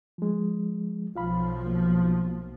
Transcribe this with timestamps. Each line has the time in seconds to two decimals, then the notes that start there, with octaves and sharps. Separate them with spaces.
0.18 F3 G#3
1.15 B1 F3 F4 F5 B5
1.67 A#3